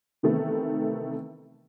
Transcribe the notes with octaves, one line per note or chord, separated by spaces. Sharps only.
C3 D#3 E3 A3 B3 C4